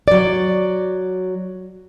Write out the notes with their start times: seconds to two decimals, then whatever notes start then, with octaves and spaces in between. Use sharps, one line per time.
0.08 F#3 D5